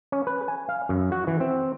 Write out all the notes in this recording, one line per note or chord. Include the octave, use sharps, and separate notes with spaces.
C#4
B4
G#5
F5
F#2
F#4
E3
C4